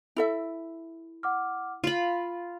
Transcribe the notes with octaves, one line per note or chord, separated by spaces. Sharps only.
E4 A4 E5
F#5 D6 F6
F4 F5 B5